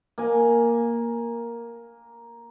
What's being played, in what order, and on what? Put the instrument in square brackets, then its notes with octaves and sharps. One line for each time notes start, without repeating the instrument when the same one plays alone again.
[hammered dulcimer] A#3 G#5